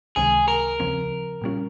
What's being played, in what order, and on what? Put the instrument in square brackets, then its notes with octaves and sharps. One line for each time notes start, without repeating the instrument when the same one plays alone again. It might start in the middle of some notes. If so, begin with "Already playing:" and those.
[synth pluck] C#2 C3 D#3 G#3 [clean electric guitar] G#4
[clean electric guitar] A#4
[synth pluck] D#2 C#3 F3 C4
A#2 G3 C#4 F4